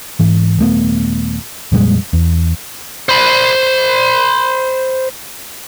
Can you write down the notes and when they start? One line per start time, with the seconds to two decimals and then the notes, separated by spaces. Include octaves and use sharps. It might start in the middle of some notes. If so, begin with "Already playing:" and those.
0.20 G#2 E3
0.59 D#1 A3 B3
1.72 F2 A#2 G3 G#3
2.13 E2
3.09 C5 B5